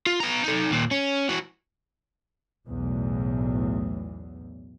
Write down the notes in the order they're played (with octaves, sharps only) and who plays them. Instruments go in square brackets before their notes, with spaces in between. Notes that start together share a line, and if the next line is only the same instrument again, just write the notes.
[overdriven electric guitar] F4
B3 A#5
D#4 A4
D#2 A#2
C#4
E3 F#4
[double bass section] B1 E2 A2